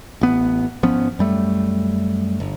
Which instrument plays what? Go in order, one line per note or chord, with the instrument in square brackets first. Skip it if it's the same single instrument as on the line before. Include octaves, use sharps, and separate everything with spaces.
[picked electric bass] A1 B3
G#1 F3 B3 C#4
F#2 G3 A3
G1